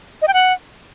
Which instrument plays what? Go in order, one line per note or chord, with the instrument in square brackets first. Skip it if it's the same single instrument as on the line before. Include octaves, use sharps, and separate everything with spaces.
[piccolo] D#5
G5
F#5